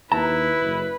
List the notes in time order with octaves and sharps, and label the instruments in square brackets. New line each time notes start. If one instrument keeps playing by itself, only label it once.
[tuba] D#2 [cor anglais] E4 [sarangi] B4 [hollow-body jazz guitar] A5 A#5
[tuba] F#1